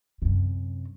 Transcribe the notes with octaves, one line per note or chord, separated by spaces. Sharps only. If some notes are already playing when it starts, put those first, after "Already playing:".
F#2 C3